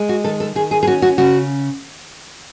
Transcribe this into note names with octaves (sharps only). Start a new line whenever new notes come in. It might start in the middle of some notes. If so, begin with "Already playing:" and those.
Already playing: G#3
F#4
D#3 A4
A4
D#3 G#4
G#4
G#4
C#4 F#4
F#4
C#3 F#4